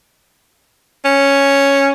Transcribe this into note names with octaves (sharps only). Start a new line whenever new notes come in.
C#4